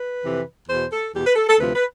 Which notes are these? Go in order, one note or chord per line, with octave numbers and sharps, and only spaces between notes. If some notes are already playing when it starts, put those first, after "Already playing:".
Already playing: B4
F2 C3 E3
E2 B2 C5
A4
E2 B2 G4
B4
A4
A4
D2 C3 F3 B4
B4